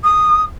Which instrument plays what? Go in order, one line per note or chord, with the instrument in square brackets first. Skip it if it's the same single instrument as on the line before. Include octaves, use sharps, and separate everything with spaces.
[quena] D#6